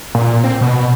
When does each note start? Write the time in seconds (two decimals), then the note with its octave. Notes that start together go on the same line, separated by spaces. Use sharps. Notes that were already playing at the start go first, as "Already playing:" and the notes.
0.15 A#2
0.44 C4
0.61 B2